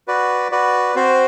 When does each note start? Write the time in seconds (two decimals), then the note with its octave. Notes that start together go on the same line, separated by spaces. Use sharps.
0.08 F#4 B4 D5
0.51 F#4 B4 D5
0.95 C4 F#4 C5